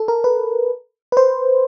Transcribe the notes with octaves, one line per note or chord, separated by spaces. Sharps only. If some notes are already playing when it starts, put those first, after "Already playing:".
Already playing: A4
A#4
B4
B4
C5